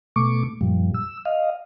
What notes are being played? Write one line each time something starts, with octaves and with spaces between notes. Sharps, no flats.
B2 A3 C#6 D6
F#2 A#2 F3 G3
E6
D#5 F5